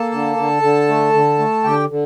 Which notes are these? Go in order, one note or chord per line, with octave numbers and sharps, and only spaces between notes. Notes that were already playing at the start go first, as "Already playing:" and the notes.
Already playing: A#3 A4 A5
D3
D3
D3
A3
D3
A3
D3 G4 G5
D3